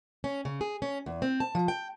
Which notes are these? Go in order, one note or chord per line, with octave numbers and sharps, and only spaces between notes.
C#4
C#3
G#4
C#4
E2
C4
A5
F3
G5